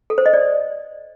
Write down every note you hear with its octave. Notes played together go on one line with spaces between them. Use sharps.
A4
C5
D#5
D5